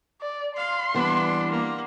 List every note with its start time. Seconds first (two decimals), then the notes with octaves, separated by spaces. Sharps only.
0.22 D5
0.57 F5 C6
0.94 E3 G3 B3 D4
1.50 A#3